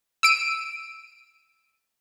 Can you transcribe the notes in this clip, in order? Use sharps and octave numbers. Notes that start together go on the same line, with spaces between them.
E6 D7 D#7